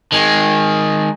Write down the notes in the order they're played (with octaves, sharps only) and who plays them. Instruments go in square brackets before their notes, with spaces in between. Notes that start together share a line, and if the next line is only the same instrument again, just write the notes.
[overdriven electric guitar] D#3 G#3